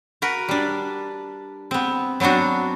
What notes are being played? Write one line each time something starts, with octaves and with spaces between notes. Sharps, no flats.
F#4 A#4 B4
G3 D4
B3 C4
F#3 B3 C4 D4 F#4